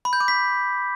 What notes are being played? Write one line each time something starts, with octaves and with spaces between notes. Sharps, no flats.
B5
G6
D6
B6